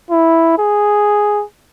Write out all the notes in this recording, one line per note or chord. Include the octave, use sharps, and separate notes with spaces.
E4
G#4